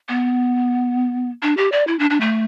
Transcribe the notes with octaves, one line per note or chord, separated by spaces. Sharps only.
B3
D4
G4
D5
E4
D4
D4
A3